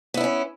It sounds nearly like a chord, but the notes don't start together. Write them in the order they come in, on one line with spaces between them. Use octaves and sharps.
B3 E4 D4 C#4